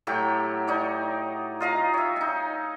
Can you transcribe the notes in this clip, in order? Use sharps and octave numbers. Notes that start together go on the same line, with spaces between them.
A2 F#3 G4 G5
D#4 C#5 D5
F4 D#5 F5 A#5
C#5 E5
D#4 G#5